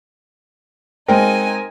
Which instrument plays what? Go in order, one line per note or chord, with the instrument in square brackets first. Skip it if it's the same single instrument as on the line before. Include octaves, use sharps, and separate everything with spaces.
[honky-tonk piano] G#3 C4 [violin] D#4 G#5 [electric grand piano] A#4 [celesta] G5